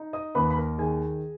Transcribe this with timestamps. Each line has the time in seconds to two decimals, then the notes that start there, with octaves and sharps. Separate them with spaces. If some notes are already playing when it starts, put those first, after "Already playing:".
Already playing: D#4
0.13 D#5 D#6
0.35 D#2 B4 B5
0.51 B5
0.56 A#4 A#5
0.78 D#3 G#4 G#5